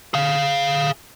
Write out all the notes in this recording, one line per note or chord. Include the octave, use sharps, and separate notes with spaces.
G#4 F5